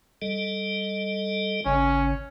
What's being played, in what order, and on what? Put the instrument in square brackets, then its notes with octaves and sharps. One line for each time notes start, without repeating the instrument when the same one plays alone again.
[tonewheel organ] G3 A4 D#5
[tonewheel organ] G#1 C#3 [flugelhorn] C#4